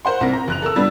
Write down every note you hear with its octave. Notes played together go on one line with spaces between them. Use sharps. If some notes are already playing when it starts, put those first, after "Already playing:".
A#4 C5 F#5 C6
C2 C4 A#4 A#6
A#5
F#1 F#6 F7
A4 A#4 A5 E6
G3 B3 D4